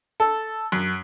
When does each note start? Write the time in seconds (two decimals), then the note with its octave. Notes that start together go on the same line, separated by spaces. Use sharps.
0.20 A4
0.72 F#2